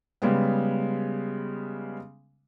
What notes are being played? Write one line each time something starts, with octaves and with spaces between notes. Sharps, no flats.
C#3 G3 G#3 B3